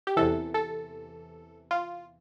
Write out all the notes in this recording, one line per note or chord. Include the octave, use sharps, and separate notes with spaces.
G4
E2 C3 E3 A4
A4
F4